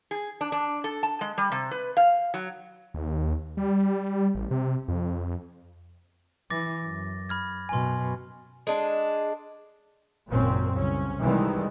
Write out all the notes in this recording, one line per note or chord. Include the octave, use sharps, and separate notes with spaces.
G#4
D4
D4
A4
A5
G#3
G3
C3
B4
F5
F#3
D#2
G3
A1
C3
F2
E3 D6 A6 A#6
F#2
B5 F6 G#6
F#2 B2 G#5 C6
G#3 D4
G#1 F#2 A#2 C#3 C4 C#4
C2 C#3 C#4
C3 D#3 E3 G3 G#3